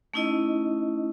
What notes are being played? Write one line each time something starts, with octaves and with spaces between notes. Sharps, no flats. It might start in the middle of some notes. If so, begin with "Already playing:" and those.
A3 C#4 D#4 E4 D#5